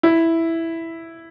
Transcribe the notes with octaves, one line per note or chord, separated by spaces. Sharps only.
E4